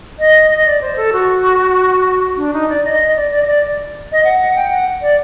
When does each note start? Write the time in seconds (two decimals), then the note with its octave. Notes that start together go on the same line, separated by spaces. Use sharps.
0.19 D#5
0.51 D#5
0.65 D5
0.81 C5
0.97 A4
1.13 F#4
2.37 D4
2.53 D#4
2.69 D5
2.85 D#5
3.00 D#5
3.16 D5
3.31 D5
3.42 D#5
3.47 D5
4.12 D#5
4.24 F#5
4.40 F#5
4.56 G5
4.71 F#5
5.02 D5